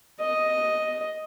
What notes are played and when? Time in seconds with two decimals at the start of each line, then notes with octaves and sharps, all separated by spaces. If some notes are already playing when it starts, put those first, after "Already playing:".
0.21 D#5